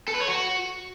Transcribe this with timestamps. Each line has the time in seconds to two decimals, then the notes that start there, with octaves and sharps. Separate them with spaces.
0.08 A4
0.14 B4
0.21 C#5
0.28 F#4